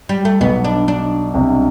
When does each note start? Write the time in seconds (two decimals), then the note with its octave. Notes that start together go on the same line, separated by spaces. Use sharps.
0.09 G3
0.25 A3
0.41 B1 B2 B3
0.64 D4
0.88 D4
1.34 C2 C3